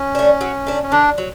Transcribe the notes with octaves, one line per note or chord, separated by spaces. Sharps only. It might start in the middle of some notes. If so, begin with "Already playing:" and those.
Already playing: C#4
A3 D4
F#3
A3 D4
C#4
D3 D4
F#3